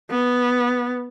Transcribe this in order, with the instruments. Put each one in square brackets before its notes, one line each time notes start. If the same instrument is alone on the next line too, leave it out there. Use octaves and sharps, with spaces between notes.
[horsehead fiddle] B3